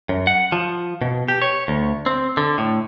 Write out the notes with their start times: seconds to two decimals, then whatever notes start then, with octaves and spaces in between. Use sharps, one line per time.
0.09 F#2
0.27 F#5
0.52 F3
1.01 B2
1.28 G4
1.42 C#5
1.68 D2
2.06 C4
2.37 D3
2.58 A2